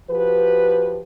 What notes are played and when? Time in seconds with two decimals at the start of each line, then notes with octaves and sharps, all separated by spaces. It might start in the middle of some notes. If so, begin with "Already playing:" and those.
0.10 F3 F#4 G4 B4